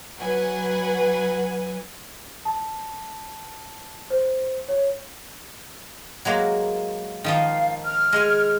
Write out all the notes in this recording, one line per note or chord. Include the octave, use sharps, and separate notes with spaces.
F#3 B4 F#5 G#5
A5
C5
C#5
F#3 G#3 A#3
D#3 F3 D#4 F5
F6
G#3 G#5